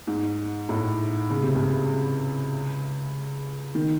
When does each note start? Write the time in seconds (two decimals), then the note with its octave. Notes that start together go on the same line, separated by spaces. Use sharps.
0.07 G#2
0.69 A2
1.30 C#3
1.42 C3
1.55 C#2 C#3
3.75 D#3